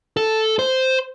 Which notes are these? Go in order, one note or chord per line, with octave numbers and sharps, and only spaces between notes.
A4
C5